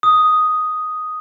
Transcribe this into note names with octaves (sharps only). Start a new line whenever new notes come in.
D#6